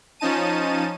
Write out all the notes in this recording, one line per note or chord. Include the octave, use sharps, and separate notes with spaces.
F3 C#4 D#4 A5 D#7